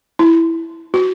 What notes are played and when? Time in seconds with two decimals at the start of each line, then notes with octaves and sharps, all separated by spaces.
0.19 E4
0.94 F#4